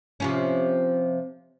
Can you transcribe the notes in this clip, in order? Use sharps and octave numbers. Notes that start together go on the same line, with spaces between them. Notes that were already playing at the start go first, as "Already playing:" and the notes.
C3 F3 C#4